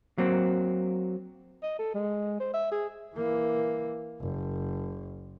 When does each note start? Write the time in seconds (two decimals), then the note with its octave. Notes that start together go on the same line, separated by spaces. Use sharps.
0.18 F#3 A#3 C4
1.63 D#5
1.79 A4
1.94 G#3
2.40 C5
2.54 E5
2.71 G#4
3.15 E3 A#3
4.21 F#1